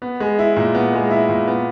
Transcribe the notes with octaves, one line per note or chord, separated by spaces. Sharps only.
B3
G#3
E4
A#2
B3
G#3
E4
A#2
B3